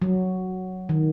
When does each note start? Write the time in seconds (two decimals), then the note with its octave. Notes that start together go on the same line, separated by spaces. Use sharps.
0.02 F#3
0.89 D#3